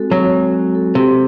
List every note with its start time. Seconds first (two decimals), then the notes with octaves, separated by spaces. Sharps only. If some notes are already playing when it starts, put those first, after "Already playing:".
Already playing: G#3 C4 F#4 A4
0.11 F#3 C4
0.33 G#3
0.54 F#4
0.75 A4
0.95 C3 A4